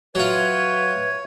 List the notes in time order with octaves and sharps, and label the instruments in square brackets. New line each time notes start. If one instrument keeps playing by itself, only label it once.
[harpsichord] F#3 F4 [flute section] B4 E5 G#6 [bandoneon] C#5